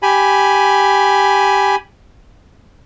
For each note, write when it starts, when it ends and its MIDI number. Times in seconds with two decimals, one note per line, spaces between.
0.03 1.76 67
0.03 1.76 80
0.03 1.76 83